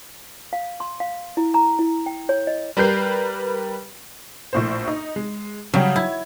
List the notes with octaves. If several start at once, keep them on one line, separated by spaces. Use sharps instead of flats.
F5
C6
F5
E4
A#5
E4
G5
C#5
D#5
G3 A#4 B4 G6 C7
A#1 A2 C5
D#4
G#3
C#3 F#3 G3 G5
E4 G#6